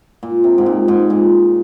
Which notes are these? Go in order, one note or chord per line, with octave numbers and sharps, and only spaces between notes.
A#2
C3
G#2
A#2
G#2
A#2